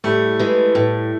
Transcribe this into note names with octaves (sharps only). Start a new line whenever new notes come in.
A2 G3 A3
E3 G#3
A2